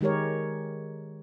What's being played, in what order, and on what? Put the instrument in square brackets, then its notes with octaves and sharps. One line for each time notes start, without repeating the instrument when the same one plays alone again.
[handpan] D#3 G#3 G4 A#4 C#5